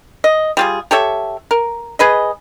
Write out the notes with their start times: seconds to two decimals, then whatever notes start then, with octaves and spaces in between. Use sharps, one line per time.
0.24 D#5
0.57 G3 F4 G#4
0.91 G4 A4 C#5 E5
1.51 A#4
1.99 G#4 B4 D#5